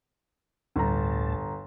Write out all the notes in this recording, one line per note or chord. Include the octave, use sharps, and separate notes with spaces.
G1 D2 A2 A5 A#5